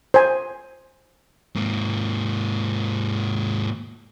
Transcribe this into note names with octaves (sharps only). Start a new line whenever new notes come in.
C5 G#5
G#2 A#3